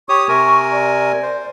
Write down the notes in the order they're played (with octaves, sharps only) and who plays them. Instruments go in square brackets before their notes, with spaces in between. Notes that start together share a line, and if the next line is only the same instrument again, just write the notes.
[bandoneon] G4 C#5 D#6 [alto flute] C#6
[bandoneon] C3 A#4 G#5
[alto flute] D5
[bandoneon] C5